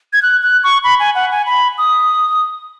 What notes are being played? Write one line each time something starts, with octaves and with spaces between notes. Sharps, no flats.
G#6
F#6
F#6
C#6
B5
G#5
F#5
G#5
B5
D#6